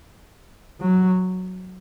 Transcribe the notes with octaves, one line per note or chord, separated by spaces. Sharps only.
F#3